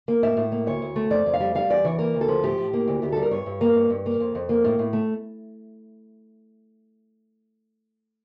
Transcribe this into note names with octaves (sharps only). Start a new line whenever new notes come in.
A#3
A2 E5
A2
A#3
D2 C#5
D2
A3
F2 D5
F2
F5
G3
G3 F5
E2 D5
E3 C#5
A#3 A#4
D2
A4
F3
A2 G4
A2
A#3
D2
D2 G4
G3 A4
A#4
G2 C#5
G2
A#3
G2
G2
A#3
F2
F2
A#3
A2
A2
A3